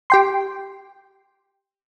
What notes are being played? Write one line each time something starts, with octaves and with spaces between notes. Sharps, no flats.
G4 G5 C6